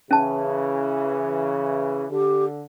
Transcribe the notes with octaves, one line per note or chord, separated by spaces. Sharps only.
C#3 E3 C#4 A5
D3 G4